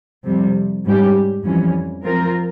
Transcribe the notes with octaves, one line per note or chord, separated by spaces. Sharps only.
F2 C3 G3
G#2 G3 C#4 G4
F2 E3 G3 C#4
F3 C4 F4 A#4